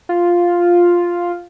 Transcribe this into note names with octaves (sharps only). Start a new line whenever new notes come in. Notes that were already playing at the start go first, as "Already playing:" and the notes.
F4